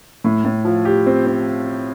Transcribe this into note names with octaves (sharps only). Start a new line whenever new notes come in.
A2
A2
F3
G4
C4
C4